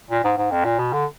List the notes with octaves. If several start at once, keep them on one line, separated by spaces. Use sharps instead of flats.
A#2
G#2
G#2
F2
A#2
B2
D3